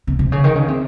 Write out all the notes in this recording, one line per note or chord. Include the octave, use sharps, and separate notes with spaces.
C3
C3
C#3
D#3
C#3
C3